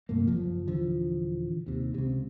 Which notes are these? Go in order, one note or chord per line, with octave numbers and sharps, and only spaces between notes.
C2 G2 A3 A#3
F#1 F3
D#1 D3 E3 F3
D#2 C3
C#2 C3